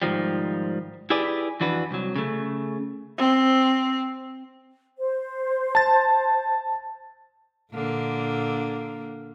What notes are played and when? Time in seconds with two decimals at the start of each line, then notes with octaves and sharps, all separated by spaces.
0.02 G#2 D#3 F3 G3
1.10 E4 G4 G#4 B4 D5
1.60 F2 E3 D4 F#4 B4
1.91 C2 F#3
2.16 C#3 A3
3.18 C4
4.98 C5
5.75 A5 A6
7.72 A#2 D3 A#3